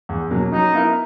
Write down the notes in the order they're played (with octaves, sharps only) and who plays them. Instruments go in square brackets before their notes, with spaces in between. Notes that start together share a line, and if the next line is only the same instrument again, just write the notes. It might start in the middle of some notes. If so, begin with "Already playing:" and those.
[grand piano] E2
B2 F#3 A#3
[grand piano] F#3 [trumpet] D#4
[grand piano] B3 E4 A#4